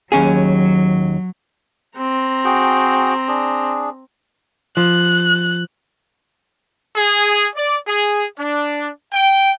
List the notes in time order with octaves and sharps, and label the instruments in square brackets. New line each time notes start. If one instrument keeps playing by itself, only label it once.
[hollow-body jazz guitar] D#2 C#4 G#4 [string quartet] F#3
[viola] C4 A#5
[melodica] F#4 G#4 G5
D4 G#4
[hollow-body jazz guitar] F3 [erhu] F#6
[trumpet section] G#4
D5
G#4
D4
G5